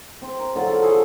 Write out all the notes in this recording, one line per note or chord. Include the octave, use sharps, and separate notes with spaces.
C4 C6
A#4
D3 F#3 F4
A4 D5
G#4 A4 B4 C#6